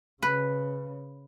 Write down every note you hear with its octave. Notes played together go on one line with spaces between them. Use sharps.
C#3 B4